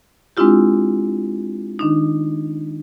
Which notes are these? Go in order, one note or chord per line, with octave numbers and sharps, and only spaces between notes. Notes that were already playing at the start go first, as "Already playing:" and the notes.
G#3 C4 D4 E4 F4 G4
D#3 D4 D#4